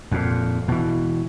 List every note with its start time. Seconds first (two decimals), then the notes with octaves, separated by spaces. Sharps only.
0.12 F2 A#2
0.68 B2 E3